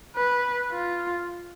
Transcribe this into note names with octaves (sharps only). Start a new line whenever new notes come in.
B4
F4